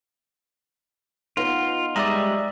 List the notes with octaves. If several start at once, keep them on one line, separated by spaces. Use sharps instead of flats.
B3 D#4 F4
G3 G#3 D5 E5 A#5